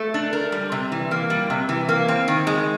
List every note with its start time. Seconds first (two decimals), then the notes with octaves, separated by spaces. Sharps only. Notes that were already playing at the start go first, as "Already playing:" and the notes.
Already playing: A3
0.14 D4
0.33 A#4
0.52 G3
0.72 C3
0.92 E3
1.11 A#3
1.30 G3
1.50 C3
1.69 E3
1.89 A#3
2.08 C4
2.28 D#3
2.47 G#3